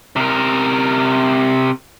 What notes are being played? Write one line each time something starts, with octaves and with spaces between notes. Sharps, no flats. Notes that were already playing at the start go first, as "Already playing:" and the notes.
C3 A#4